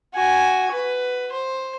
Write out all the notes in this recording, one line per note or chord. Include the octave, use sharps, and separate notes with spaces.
F#4 G#5
B4
C5